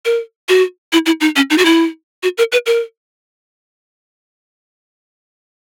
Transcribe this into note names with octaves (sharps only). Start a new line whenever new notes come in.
A#4
F#4
E4
E4
D#4
C#4
D#4
F#4
E4
F#4
A#4
B4
A#4